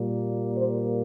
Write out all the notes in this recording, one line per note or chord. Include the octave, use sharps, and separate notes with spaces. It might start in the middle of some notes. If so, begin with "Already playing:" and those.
Already playing: A#2 G3 A#3
C5